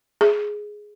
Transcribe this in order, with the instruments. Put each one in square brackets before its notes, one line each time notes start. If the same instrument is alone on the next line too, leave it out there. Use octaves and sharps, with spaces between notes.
[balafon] G#4